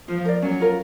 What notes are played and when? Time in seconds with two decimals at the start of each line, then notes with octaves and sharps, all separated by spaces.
0.08 F3 F4
0.25 A#4 D5
0.42 F#3 C#4
0.60 F4 A#4